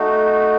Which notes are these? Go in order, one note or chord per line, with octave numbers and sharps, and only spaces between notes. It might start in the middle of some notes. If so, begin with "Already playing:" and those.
Already playing: A3 D#4 F#4